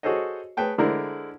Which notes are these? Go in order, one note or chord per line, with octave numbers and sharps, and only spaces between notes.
F#4 G#4 A4 C5 C#5 D#5
G#4 B4 C#5 G5 A5
D3 G#3 E4 A#4 C5 D5